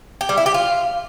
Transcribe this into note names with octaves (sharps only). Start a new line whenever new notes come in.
G4
G3
E4
G4
F4